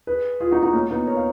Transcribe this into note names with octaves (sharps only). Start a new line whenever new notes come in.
G#4 B4
F4 G#4
D#4 F#4
D#4 F#4
A#3 C#4
B3 D#4
A#4 C#5
F5